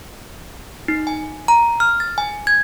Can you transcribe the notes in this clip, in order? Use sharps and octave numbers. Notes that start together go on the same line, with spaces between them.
D#4
G#5
A#5
F6
A6
G#5
G#6